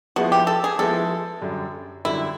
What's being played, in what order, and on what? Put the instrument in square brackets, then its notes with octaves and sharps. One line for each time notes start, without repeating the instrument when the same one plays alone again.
[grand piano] F3 G#3 B3 E4 [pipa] F#4
[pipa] G4
A4
G#4
[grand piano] F3 G#3 B3 E4 [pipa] A4
[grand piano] F#2 D3 G3
[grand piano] F#2 D3 G3 [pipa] E4